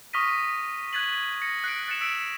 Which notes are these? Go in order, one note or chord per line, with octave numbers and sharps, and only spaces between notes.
C#6 D#6 F6 A#6 B6 D#7
F#6 G#6 A6 B6 F#7
A#6 C#7
F#6 C7 D7
F#6 A6 C#7 E7 F7
E6 B6 D7